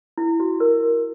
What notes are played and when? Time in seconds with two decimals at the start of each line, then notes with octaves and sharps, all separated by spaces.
0.18 E4
0.40 F#4
0.60 A#4